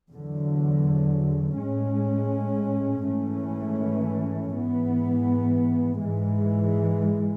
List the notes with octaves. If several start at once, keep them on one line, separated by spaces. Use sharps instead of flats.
E2 D3 F#3
A2 G#3 C#4
G#2 E3 A3 C#4
G#2 E3 B3
G#2 E3 G#3